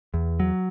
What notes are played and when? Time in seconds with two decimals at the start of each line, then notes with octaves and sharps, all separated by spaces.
0.14 E2
0.40 F#3